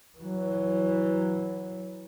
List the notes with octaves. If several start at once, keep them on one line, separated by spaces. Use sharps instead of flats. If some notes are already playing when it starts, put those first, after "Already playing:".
E3 F#3